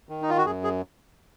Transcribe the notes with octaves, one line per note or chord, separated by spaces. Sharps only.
D#3
D#4
F4
F#4
F#2 G#4
G#4